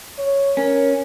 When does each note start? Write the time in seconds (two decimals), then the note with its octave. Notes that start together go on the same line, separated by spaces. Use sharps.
0.18 C#5
0.57 C#4 A#4